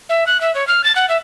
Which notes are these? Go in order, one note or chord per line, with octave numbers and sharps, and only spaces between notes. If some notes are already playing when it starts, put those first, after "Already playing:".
E5
F#6
E5
C#5
F6
A6
F#5
E5